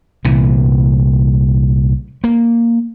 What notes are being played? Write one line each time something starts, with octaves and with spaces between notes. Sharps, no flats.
C2 A#2 E3
A#3